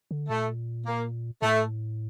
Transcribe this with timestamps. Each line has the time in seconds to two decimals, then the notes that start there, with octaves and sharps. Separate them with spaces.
0.11 D3
0.29 A#2 A3
0.86 A#3
1.42 A2 A3